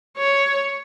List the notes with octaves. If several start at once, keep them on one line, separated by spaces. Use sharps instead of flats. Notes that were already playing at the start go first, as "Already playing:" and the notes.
C#5